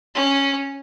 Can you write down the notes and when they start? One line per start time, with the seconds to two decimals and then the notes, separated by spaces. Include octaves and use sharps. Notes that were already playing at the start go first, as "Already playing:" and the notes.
0.15 C#4